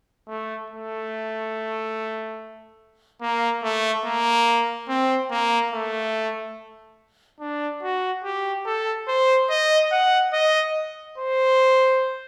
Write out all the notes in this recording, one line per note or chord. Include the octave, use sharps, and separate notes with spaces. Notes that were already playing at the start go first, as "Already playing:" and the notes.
A3
A3
A#3
A3
A#3
C4
A#3
A3
D4
F#4
G4
A4
C5
D#5
F#5
D#5
C5